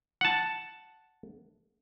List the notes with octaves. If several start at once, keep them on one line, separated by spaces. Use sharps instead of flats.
F#5 A5